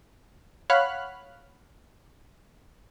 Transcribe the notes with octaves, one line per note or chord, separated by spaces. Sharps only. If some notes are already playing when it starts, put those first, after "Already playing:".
C#5 F5 F#5 B5 F6 F#6